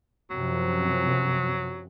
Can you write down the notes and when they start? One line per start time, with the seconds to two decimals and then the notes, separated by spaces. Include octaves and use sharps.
0.30 F#2 C3 F3 F#3